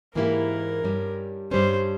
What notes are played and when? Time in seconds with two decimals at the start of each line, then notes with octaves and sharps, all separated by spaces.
0.15 G#2 E3 A#3 E4 G4 A#4
0.84 G2 G3 C#4
1.51 G2 G3 C#4 C5